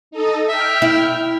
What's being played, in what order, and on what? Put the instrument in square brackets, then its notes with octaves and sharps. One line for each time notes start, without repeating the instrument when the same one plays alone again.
[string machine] D#4 A4 D#5
[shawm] E5 [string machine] G5 F6
[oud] E4